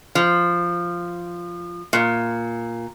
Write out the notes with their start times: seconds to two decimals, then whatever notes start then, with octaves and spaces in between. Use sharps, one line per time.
0.15 F3
1.93 A#2